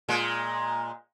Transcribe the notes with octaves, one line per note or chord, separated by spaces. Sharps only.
A#2 G#3